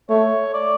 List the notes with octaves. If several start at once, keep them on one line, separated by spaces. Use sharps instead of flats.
A3 C#5
D5